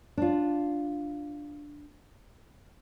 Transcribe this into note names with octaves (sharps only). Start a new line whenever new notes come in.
D4 F4